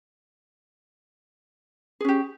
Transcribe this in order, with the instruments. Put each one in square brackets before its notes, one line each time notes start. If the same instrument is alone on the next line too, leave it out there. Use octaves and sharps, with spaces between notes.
[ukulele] G#4
C#4
G4